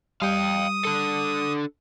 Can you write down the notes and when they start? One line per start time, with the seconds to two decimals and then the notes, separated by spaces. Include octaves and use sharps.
0.22 G3 F5 G5 D#6
0.85 D4 A4